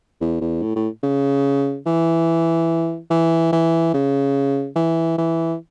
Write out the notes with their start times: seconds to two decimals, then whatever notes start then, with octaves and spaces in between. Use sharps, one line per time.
0.21 E2
0.41 E2
0.62 A2
0.76 A2
1.03 C#3
1.86 E3
3.11 E3
3.52 E3
3.94 C#3
4.76 E3
5.18 E3